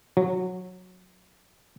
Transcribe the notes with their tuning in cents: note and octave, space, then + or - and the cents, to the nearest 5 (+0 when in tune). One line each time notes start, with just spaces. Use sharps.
F#3 -15